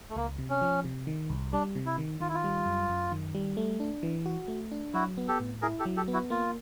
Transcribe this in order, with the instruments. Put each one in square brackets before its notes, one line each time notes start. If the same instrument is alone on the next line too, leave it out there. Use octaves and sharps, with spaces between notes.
[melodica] A3
[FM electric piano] C#2 [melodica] A#3
[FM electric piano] C3
[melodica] C#4
[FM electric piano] F3
C3
D#3
C2
[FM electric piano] G3 [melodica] D4
[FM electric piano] C3
[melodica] E4
[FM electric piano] D#3
[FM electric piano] D#3 [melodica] F4
[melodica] E4
F4
[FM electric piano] G3
F#2
F#2
D#3
G3
A3
D4
E3
F#4
A3
D4
[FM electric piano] F#3 [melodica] E4 F#4
[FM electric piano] B3
[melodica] G4 A4
[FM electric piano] A2
[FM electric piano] E4 [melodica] G#4 A#4
[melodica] G4 A4
[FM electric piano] F#3
[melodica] G4 A4
[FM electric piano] B3
[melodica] E4 F#4
[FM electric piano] A#3 [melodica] F4